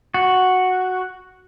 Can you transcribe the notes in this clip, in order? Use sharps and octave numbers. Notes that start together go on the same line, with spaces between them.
F#4